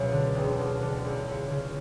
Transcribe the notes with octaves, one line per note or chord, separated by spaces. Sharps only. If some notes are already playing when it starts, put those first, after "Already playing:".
Already playing: C#2 B2 F#3 E5
D3
E1
D2
D3
C#2
C#2
C#3